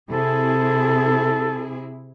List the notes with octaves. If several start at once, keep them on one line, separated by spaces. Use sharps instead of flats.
C3 E4 G#4 A4